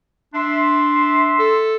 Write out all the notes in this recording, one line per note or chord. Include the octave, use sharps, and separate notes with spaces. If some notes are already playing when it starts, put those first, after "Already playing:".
D4 E5 C6
A4